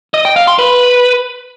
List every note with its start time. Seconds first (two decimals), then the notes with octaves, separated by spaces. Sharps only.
0.14 D#5
0.25 G5
0.36 F5
0.47 C6
0.59 B4